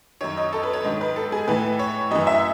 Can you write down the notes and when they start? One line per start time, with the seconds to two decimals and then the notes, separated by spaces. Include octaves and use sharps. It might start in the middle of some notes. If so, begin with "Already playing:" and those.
0.21 F#2 D#3 C#5
0.38 D#5
0.53 A4
0.63 B4
0.73 C#5
0.84 G#2 D#3 D#5
1.01 B4
1.16 A4
1.32 G#4
1.48 A2 E3 B4
1.79 C#5
2.11 F#2 E3 D#5
2.27 E5